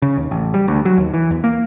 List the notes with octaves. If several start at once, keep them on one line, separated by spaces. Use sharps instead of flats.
C#3
D#2
A1
G3
D2
F#3
D#2
E3
E2
A#3